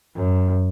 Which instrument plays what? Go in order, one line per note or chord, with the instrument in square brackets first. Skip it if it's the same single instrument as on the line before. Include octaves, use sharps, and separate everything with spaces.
[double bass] F#2